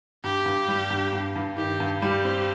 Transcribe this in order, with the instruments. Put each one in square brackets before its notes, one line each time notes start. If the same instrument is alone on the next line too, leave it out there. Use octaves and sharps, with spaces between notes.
[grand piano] G2 [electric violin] G4
[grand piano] G2
G3
G2
G2
G2
[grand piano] D#3 [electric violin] G4
[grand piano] G2
[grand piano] G3 [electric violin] G4
[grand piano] C4